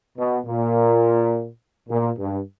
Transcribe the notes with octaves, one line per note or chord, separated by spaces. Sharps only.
B2
A#2
A#2
G2